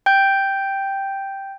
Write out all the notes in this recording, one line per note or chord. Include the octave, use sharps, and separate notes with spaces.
G5 G6